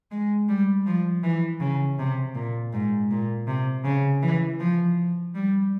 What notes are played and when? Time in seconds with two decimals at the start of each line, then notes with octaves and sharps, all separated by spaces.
0.11 G#3
0.49 G3
0.86 F3
1.24 E3
1.61 C#3
1.99 C3
2.35 A#2
2.73 G#2
3.11 A#2
3.48 C3
3.85 C#3
4.22 E3
4.60 F3
5.35 G3